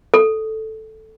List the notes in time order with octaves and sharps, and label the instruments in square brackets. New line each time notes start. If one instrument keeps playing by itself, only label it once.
[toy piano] A4